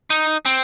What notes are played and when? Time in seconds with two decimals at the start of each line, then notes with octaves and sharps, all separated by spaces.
0.10 D#4
0.46 C4